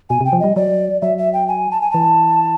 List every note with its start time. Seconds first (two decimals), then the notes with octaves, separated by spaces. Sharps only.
0.10 B2 G#5
0.21 C3
0.25 G5
0.33 F3
0.40 G3 D#5
0.56 F#3 D5
1.02 F#3 E5
1.18 E5
1.33 G5
1.48 G#5
1.71 A5
1.81 G#5
1.91 E3 A5